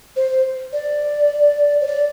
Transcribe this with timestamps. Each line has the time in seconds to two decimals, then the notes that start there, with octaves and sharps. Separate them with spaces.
0.16 C5
0.73 D5
1.81 C#5
1.87 D5